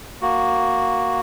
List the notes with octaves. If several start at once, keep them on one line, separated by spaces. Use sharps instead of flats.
A#3 F#4